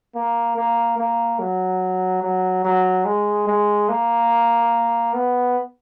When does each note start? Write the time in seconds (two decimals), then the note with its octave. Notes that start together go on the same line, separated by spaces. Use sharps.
0.15 A#3
0.57 A#3
0.98 A#3
1.39 F#3
2.23 F#3
2.64 F#3
3.05 G#3
3.47 G#3
3.89 A#3
5.13 B3